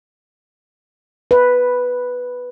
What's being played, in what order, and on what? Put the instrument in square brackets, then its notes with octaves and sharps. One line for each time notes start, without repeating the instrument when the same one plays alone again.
[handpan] B4